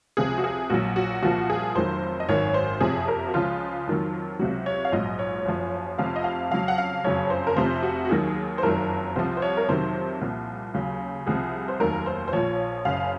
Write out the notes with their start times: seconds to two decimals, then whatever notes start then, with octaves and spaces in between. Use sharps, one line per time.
0.17 C#2 C3 F3 G#4
0.38 F#4
0.44 G#4
0.70 A#1 A#2 F#3 F#4
0.96 F#4
1.22 C2 A#2 F3 F#4
1.50 G#4
1.75 F1 F2 D#3 F#3 C5
2.20 D#5
2.29 G#1 F#2 D#3 C#5
2.54 C5
2.80 F#1 F2 C3 F3 G#4
3.08 A#4
3.28 F#4
3.34 C#2 C#3 F3 F4
3.87 F2 D#3 F#3
4.39 C#2 C3 F#3 F#4
4.66 C#5
4.85 F5
4.92 A#1 G#2 F#3 D#5
5.19 C#5
5.45 F#1 F#2 F3
5.98 F1 F2 C3 F3 F5
6.16 D#5
6.24 F5
6.51 F2 C#3 F#3 F5
6.68 F#5
6.78 F5
7.04 F#1 F2 C#3 F#3 C#5
7.30 C5
7.47 A#4
7.56 F1 F2 C3 F3 C5
7.83 F#4
8.05 F#4
8.09 D#2 D#3 F#3 G#4
8.58 C5
8.63 F#1 F2 D#3 F#3 A#4
9.16 C2 C3 F3 C5
9.37 C5
9.42 C#5
9.57 A#4
9.68 F2 C3 D#3 F#3 C5
10.21 C2 A#2 F3
10.74 D#2 C#3 F#3
11.27 C2 C3 F3 G#4
11.68 C5
11.80 F1 D#2 D#3 F#3 A#4
12.06 C5
12.28 C5
12.33 A#1 A#2 F3 C#5
12.85 F#1 F#2 C#3 F5